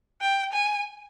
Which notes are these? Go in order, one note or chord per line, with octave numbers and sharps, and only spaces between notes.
G5
G#5